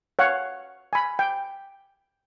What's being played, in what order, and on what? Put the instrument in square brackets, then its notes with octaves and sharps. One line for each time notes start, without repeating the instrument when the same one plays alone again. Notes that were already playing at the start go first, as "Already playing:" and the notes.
[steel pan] C#5 F5 F#5
G#5 B5
G5